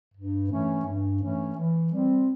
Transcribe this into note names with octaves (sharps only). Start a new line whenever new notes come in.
G2
E3 A3 C#4
G2
E3 A3 C#4
E3
G3 C4